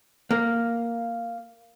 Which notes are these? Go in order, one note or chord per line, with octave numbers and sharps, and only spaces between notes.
A#3